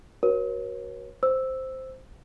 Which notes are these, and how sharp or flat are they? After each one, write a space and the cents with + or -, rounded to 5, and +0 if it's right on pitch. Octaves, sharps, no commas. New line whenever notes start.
F#4 +10 A#4 +45 C#5 -25
C5 +0 E6 +0